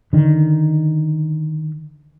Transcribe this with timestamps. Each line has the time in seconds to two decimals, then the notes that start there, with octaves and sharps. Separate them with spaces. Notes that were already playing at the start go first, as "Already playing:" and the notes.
0.13 D3 D#3